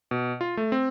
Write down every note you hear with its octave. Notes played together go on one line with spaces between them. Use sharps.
B2
F4
A3
C4